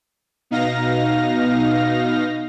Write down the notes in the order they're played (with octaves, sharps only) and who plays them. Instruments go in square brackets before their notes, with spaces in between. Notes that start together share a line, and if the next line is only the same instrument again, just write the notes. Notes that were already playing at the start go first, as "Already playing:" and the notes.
[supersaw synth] B2 D#4 F5 A#6